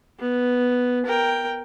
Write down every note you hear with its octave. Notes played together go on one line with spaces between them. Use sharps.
B3
A#4 G5